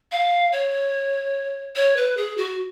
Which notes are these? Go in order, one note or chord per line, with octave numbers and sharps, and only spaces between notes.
F5
C#5
C#5
B4
G#4
F#4